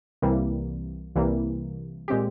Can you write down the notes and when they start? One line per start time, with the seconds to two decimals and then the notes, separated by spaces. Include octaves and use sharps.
0.22 C2 C3 E3 G3 A#3
1.16 C2 C3 E3 G3 A#3
2.08 A#2 G#3 C4 G4